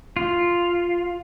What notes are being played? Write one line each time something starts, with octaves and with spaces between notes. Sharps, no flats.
F4